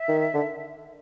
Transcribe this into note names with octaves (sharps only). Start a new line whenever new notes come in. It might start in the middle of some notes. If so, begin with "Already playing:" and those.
Already playing: E5
D#3
D3